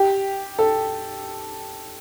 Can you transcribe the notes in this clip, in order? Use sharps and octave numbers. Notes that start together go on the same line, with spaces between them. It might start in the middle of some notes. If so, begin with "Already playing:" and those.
Already playing: G4
A4